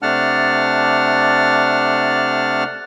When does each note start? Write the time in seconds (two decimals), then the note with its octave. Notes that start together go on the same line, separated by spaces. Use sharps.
0.02 C3 A3 D4 F#5 A5 F6